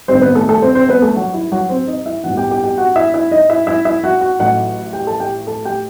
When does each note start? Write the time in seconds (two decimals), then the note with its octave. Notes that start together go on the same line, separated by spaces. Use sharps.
0.08 A1 G2 D#3 C4 C5
0.21 B3 B4
0.35 A3 A4
0.49 A3 A4
0.62 C4 C5
0.75 C4 C5
0.89 B3 B4
1.02 A3 A4
1.16 F#3 F#4
1.34 E4
1.52 F#3 F#4
1.69 C4 C5
1.88 D#4 D#5
2.06 E4 E5
2.23 A1 G2 E3 B3 D#4 F#4 F#5
2.37 G4 G5
2.51 G4 G5
2.64 G4 G5
2.78 F#4 F#5
2.96 E4 E5
3.14 E4 E5
3.32 D#4 D#5
3.50 E4 E5
3.67 E4 E5
3.85 E4 E5
4.04 F#4 F#5
4.21 F#4 F#5
4.39 A1 A2 F#3 A3 D#4 F#4 F#5
4.93 G4 G5
5.07 A4 A5
5.20 G4 G5
5.47 A4 A5
5.65 G4 G5